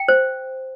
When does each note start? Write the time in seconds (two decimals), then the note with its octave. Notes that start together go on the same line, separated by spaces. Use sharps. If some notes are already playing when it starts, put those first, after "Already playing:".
Already playing: G5
0.08 C5